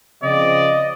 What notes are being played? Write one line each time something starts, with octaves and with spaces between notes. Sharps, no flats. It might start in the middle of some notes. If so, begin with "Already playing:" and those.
C#3 F3 C4 D5 D#5